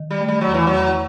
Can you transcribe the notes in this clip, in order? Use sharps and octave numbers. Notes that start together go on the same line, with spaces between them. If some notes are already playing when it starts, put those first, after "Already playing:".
Already playing: D#3
G3
A3
G3
F#3
E2
E3
F#3
E2